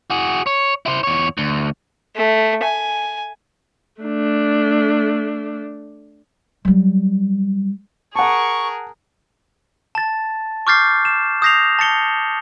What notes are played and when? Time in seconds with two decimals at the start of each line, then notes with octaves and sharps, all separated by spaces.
0.10 F#4 G#4
0.46 C#5
0.86 E4 C5
1.03 E2 C#5
1.38 D2
2.16 A3
2.63 G#5
4.01 A3 D4
6.65 F#3 G3
8.15 G#4 A#4 F#5 A5 C#6
9.95 A5 A6
10.67 C#6 D6 F6 G6 A6 C7
11.05 E7
11.42 D#6 G6 A#6 C7 F7
11.79 A5 A6 C#7 G7